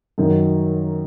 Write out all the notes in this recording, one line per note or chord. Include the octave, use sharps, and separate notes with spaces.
F#2 D#3 F#3